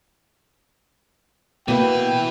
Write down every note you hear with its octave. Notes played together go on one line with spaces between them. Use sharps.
B2 E3 A#3 B3 B4 G5